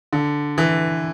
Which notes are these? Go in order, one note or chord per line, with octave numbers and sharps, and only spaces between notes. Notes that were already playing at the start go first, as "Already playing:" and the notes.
D3
E3